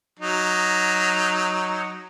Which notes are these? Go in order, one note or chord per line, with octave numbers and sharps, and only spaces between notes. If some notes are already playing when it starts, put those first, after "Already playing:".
F#3 D#4